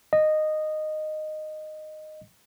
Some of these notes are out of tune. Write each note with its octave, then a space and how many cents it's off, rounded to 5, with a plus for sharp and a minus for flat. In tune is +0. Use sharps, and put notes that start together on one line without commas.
D#5 -10